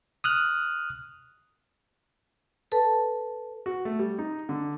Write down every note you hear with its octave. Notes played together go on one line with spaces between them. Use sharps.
D#6 F6 F#6
A4 B4 A5
F#4
A3
G3
D#4
D3